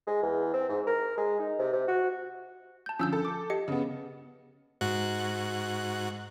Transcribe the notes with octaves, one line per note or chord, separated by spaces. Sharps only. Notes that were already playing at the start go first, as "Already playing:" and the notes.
G#3
E2
C4
G#2
A#4
G#3
D#4
C3
C3
F#4
A5 G6
D3 F3 C#4 E6 G6
A4
D6
G4 D#5 C#7
C#3 B3
G#2 F#4 F#6